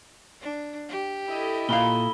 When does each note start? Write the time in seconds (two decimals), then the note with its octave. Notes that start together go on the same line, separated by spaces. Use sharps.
0.41 D4
0.89 G4
1.28 E4 A4 D#5
1.69 A#2 F5 B5 G7